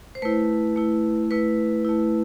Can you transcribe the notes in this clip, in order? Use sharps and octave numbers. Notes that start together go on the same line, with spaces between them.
C5
A3 E4 B4
A3 E4
A3 E4 B4
A3 E4